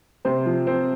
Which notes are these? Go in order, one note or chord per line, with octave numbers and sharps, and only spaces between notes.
C3 C5
F3
C4